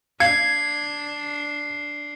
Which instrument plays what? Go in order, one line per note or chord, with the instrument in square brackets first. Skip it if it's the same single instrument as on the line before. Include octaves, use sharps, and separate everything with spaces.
[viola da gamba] D4 [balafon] F5 [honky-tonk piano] G#6 [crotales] C7